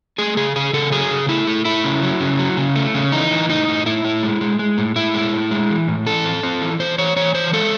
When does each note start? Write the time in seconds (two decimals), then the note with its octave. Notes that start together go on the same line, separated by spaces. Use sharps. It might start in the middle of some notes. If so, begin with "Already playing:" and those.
0.18 A3 G#4
0.37 C#3 G#4
0.56 C#3 G#4
0.73 C#3 A4
0.92 F#3 G#4
1.11 C#3
1.29 A3 E4
1.47 A3
1.65 A3 E4
1.84 C#3
2.02 F#3
2.20 C#3
2.39 F#3
2.57 C#3
2.75 A3
2.94 C#3
3.12 E3 D#4
3.31 E3
3.49 A2 D#4
3.68 A2
3.86 A2 E4
4.05 A2
4.23 G#3
4.41 G#3
4.59 G#3
4.78 A2
4.96 A2 E4
5.14 G#3
5.33 A2
5.51 G#3
5.70 E3
5.88 A2
6.06 E3 A4
6.25 C4
6.43 C4
6.61 E3
6.80 E3 C5
6.98 E3 C#5
7.16 E3 C#5
7.35 E3 C5
7.53 G#3 A4